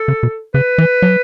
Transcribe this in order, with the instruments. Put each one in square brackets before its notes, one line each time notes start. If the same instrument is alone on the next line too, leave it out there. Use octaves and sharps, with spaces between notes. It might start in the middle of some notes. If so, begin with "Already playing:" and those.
Already playing: [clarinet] A4
[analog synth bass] C#3
B2
[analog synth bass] C#3 [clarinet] B4
[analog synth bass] E3
F#3